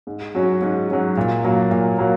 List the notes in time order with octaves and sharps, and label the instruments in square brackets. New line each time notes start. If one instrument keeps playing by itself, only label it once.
[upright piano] G#2
F#3 C#4 F#4
G#2
F#3 C#4 F#4
A#2
F#3 A#3
A#2
F#3 A#3